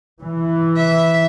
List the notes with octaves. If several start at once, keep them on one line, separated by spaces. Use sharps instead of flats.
E3
E5